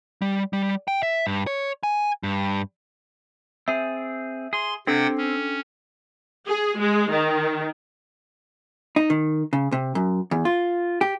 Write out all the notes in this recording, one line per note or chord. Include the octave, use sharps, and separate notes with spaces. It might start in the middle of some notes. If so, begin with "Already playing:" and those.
G3
G3
G5
E5
G2
C#5
G#5
G2
C4 G#4 E5
G#4 C6
C3 C4 D4 A4 F#5 G5
C#4
G#4
G#3
D#3
D#4
D#3
C#3
C3
F#2
E2
F4
G4